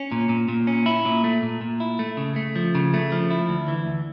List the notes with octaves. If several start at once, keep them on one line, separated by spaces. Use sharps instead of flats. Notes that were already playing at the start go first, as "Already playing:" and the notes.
Already playing: C#4
A#2
A#2
A#2
C#4
E4
A#2
A3
A#2
A#2
E4
A3
C#3
A3
F3
C#3
A3
F3
E4
D2
E3
D2